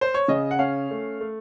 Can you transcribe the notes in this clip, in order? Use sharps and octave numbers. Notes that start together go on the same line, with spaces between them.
C5
C#5
C#3 D#5
F#5
C#4 F5
A3
A3